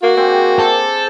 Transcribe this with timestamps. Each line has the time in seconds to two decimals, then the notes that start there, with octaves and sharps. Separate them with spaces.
0.03 A#3 F#4
0.17 G#3 A#3 C4 G4
0.59 C4 A4 C5 D5